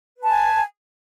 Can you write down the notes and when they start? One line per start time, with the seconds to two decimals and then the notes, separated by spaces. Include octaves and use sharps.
0.18 B4
0.23 A5
0.28 G#5